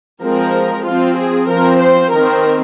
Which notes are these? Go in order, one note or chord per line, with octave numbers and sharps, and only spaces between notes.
F3 G#3 C4 A#4
F3 C4 F4
G#4
F3 C4 A#4
C5
D#3 C4 A#4